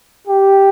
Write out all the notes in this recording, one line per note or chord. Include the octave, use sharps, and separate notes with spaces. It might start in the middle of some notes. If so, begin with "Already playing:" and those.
G4